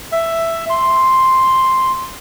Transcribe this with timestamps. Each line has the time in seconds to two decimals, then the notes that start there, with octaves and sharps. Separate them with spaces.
0.12 E5
0.70 C6